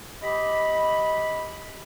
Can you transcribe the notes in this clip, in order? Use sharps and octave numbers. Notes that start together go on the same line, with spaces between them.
G4 D#5 B5